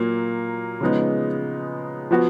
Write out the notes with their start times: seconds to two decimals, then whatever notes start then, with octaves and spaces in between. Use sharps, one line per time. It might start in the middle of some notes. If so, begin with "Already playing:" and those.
Already playing: A#2 F#3 A#3
0.81 C#3 F3 G#3 B3 D#4
2.11 F3 B3 F#4